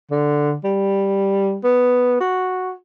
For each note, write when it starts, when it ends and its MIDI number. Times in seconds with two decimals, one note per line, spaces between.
0.11 0.55 50
0.64 1.58 55
1.64 2.19 59
2.21 2.73 66